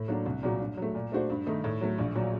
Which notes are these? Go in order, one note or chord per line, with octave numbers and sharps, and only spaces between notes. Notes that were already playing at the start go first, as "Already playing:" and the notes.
Already playing: A2
F#3 A#3 D4 F#4
C2
A#2 F#3 A#3 F#4
G2
F#3
A3
A#2
A3 D4 F#4 C5
G2
D#3 A3 D#4
A2
F#3 A3
A#1
A#2 F#3